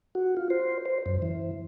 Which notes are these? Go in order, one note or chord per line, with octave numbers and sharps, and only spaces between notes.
F#4
F4
C5
C5
F#2
E3